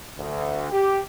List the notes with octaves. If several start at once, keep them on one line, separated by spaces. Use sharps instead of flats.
D2
G4